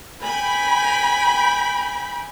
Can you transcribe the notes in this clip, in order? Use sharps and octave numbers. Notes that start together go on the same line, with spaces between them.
G5 G#5 B5